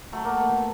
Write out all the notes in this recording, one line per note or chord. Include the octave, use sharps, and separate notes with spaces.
F#3 A3
A#3
A3
B2